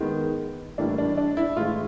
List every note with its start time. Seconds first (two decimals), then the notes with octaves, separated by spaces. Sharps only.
0.01 D#3 G#3 B3
0.78 A2 E3 G3 A#3 D4
0.98 D4
1.18 D4
1.37 E4
1.57 A2 E3 G#3 F4